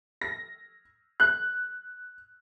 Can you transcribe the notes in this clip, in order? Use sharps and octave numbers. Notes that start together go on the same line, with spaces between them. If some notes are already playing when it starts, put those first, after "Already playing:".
A#6
F#6